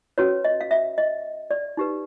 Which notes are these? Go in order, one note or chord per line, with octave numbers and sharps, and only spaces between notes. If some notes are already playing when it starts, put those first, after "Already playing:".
C#4 F#4 B4 C#5
D#5
F5
E5
D#5
D5
D#4 G4 B4